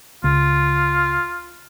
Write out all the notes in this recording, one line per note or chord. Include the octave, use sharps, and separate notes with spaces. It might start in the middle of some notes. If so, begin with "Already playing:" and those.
C#2 F4